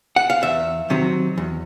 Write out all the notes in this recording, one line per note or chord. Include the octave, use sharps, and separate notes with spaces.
F#5
F5
E2 E5
C3 D#3 F#3
E2